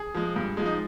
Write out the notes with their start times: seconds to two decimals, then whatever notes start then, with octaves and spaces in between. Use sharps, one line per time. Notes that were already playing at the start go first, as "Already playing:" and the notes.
Already playing: G#4
0.15 F3 G#3
0.36 G2
0.57 F3 G#3
0.65 D#4